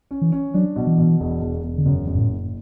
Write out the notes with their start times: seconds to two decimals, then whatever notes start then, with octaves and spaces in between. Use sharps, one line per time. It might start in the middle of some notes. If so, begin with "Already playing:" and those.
0.11 C#4
0.22 E3
0.32 C#4
0.54 F#3 D4
0.76 B2
0.87 E3
0.98 B2
1.20 E1
1.41 E1
1.63 E1
1.78 D3
1.85 F#2 C#3
2.07 F#2
2.15 G2
2.19 A2
2.29 F#1